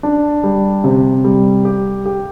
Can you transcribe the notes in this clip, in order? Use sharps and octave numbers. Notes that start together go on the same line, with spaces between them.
D4
G3
C3
G3
G4
G4